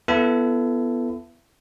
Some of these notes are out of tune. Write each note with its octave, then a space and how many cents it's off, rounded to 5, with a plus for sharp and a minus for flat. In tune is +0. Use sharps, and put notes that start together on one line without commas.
B3 +0 E4 +35 A4 +0